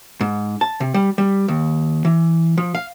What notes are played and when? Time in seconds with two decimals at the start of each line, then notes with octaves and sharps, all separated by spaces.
0.21 G#2
0.61 A5
0.80 C3
0.94 G3
1.18 G3
1.48 D#2
2.05 E3
2.57 F3
2.75 F5